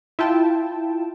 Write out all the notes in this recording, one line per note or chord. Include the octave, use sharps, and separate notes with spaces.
E4 F4 G5 A5